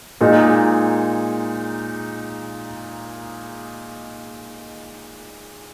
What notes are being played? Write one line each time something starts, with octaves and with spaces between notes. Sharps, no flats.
A#2 G#3 D#4